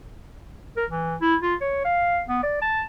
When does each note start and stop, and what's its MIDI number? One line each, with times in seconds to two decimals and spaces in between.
0.77 0.85 70
0.90 1.15 52
1.21 1.35 64
1.42 1.55 65
1.61 1.84 73
1.85 2.20 77
2.29 2.41 59
2.43 2.61 74
2.62 2.83 81